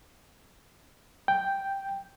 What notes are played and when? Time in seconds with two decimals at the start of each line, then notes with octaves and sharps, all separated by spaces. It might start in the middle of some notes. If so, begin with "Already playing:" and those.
1.28 G5